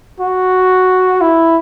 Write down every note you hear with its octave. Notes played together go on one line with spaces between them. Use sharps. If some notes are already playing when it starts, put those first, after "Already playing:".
F#4
E4